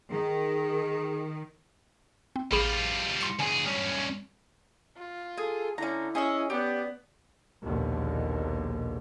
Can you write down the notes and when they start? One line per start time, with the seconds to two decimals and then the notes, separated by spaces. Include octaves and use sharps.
0.11 D#3 G#4
2.36 C4
2.52 A1 G3 F4 G#4 B5
3.21 C6 C#7
3.40 D2 G#4 G#5
3.66 G2 C#4
4.97 F4
5.38 G#4 A4 G#5
5.78 D3 C#4 E4 A#5
6.15 C#4 G#4 D#5 E6
6.50 B3 G4 D5
7.63 A#1 D#2 B2 D3